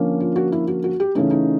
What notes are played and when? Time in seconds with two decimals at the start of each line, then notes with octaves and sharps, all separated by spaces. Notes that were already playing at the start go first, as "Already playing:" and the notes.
Already playing: D3 F3 A#3 C#4
0.20 F4
0.36 F#4
0.52 E4
0.68 F#4
0.84 F#4
1.00 G4
1.15 C#3 E3 A3 C#4 D#4
1.31 D#4